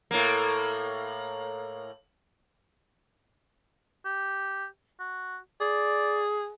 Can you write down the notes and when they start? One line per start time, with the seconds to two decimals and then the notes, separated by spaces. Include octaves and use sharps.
0.11 A2 A#3
4.05 G4
4.99 F#4
5.61 G#4 D5